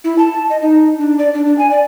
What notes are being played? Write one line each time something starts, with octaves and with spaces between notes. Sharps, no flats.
E4
A5
D#5
D#4
D4
D5
D4
D4
G#5
D5